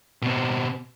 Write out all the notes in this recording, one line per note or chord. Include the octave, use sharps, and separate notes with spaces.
B2 C4